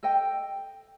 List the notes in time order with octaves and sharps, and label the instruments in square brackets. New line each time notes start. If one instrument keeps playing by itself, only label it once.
[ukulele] A4 D#5 G5